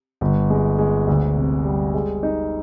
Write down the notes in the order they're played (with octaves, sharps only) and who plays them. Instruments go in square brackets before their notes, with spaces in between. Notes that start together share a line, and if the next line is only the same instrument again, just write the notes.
[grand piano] G1
G#3
G#3
D2
C3
G3
G#3
D#4